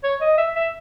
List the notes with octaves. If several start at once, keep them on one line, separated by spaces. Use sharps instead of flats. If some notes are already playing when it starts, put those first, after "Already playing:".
C#5
D#5
E5
E5